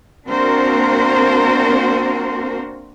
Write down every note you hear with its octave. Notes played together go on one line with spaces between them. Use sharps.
A#3 C4 D4 F#4 A#4 C5